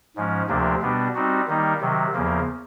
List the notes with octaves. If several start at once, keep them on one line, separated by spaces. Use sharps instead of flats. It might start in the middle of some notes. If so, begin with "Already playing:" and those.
G#2 F3 G#3 C#4
D2 C3 F3 A#3 D4
B2 G3 B3 D4
G3 C4 D#4 F#4
D#3 G3 A#3 D#4
C3 D#3 F#3
E2 C#3 F3 A#3